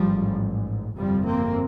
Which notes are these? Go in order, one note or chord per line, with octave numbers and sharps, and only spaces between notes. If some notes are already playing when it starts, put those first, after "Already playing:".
Already playing: A1 G#2 F3 G3
G1 F2 C3 F3 G3
A#3 C4